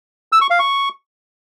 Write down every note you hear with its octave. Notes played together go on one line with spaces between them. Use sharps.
E6
C#6
F5
C#6